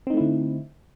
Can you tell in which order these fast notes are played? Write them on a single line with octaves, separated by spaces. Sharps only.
C4 D#4 A3 E4 D3